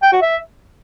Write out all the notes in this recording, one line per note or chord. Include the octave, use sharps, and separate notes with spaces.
G5
F#4
E5